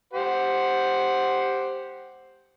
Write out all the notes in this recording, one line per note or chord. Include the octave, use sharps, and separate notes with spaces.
G4 C5 F#5